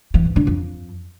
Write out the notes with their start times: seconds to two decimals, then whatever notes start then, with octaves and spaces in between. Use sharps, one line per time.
0.14 E3
0.25 G#2
0.36 D3
0.47 F2